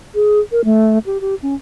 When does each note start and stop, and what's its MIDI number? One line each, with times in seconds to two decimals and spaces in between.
0.15 0.40 68
0.52 0.61 70
0.65 0.99 57
1.06 1.21 67
1.21 1.35 67
1.42 1.54 61